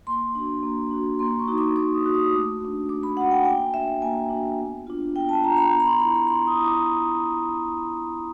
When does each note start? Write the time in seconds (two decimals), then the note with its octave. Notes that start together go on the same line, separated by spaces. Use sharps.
0.07 A#3 C6
0.35 D4 F#4
0.63 A#3
0.91 D4 F#4
1.19 A#3 C6
1.39 C#6
1.48 D#4 F#4
1.58 D6
1.76 A#3 D6
1.94 D#6
2.04 D#4 F#4
2.14 D#6
2.33 A3
2.60 D4 F#4
2.89 A3 D6
3.03 B5
3.17 D4 F#4 F#5
3.31 G5
3.41 G#5
3.45 A#3 G5
3.74 D4 F#4 E5
4.02 A#3 G#5
4.30 D4 F#4
4.58 B3
4.87 D4 F4
5.15 B3 G5
5.29 A5
5.44 D4 F4 A#5
5.57 B5
5.71 B3 A#5
5.80 B5
5.86 C6
5.99 E4 B5
6.14 B5
6.28 B3 C6
6.47 D#6
6.57 E4
6.65 D6